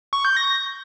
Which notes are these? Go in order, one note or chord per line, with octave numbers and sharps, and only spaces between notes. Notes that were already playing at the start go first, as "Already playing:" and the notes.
C#6
G6
A#6